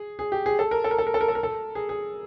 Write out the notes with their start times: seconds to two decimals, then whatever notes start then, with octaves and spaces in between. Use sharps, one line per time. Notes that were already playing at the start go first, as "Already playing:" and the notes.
Already playing: G#4
0.19 G#4
0.32 G4
0.46 G#4
0.59 A4
0.71 A#4
0.84 A4
0.91 A#4
0.98 A4
1.07 A#4
1.14 A4
1.21 A#4
1.28 A4
1.35 A#4
1.43 A4
1.75 G#4
1.89 G#4